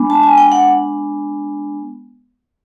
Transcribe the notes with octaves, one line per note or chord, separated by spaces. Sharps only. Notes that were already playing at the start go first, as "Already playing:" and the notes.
Already playing: G#3 B3 D4
A5
G#5
G5
F#5